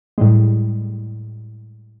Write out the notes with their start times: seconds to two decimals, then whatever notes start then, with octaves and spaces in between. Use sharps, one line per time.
0.18 A2 G3 G#3